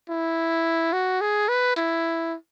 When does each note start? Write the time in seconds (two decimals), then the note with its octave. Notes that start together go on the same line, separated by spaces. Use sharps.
0.09 E4
0.93 F#4
1.21 G#4
1.48 B4
1.76 E4